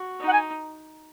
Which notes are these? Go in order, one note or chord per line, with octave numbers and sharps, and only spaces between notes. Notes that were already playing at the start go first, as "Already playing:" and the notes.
Already playing: F#4
D#4
F#5
G#5